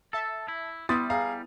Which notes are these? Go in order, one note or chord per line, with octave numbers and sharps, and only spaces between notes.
A4 E5 A5
E4
G3 B3 E4 C6 D#6 A6
G#4 F5 A#5